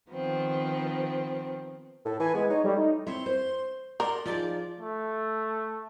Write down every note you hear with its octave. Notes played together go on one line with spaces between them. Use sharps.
D#3 F3 B3 C4
A2 A4
E3 G#5
G#3 B3
D#4 C#5
G3 A3
D#4
C4 E4 C#5 E5 C6
C5
A#4 D5 C6
F3 D#4 G#4 D5
A3